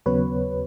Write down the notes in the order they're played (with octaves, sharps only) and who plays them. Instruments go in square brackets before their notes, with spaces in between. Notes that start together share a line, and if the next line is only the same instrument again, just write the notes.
[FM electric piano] D#2 C#3 F#3 B3 B4 C#5